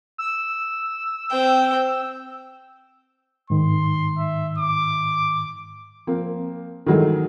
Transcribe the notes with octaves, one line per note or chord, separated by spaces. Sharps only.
E6
C4 G5
G#2 D#3 C6
E5
D6
F3 A#3 C4
D#3 E3 F#3 G#3 A3